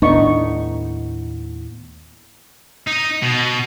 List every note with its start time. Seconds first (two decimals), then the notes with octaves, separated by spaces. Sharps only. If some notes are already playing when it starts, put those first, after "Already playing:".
0.02 D#2 A2 B3 D4 D#4 C#6
2.87 D#4
3.22 B2